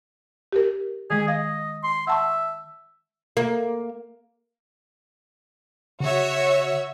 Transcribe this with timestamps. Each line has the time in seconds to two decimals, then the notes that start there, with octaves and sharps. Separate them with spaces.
0.52 G4 A#4
1.10 D#3 G#3 G#4
1.28 D#5 F5
1.84 C6
2.07 E5 F#5 A5 C#6
3.37 A#3
6.00 C#3 F#4 C#5 E5